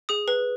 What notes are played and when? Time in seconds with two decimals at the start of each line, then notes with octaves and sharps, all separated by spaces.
0.09 G#4 D#6
0.28 B4